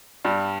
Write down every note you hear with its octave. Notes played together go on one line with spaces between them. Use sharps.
G2 G3